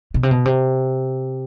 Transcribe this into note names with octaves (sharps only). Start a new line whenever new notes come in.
B2
C3
B2
C3